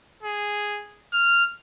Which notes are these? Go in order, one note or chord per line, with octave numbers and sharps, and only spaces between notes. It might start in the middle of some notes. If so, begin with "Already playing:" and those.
G#4
F6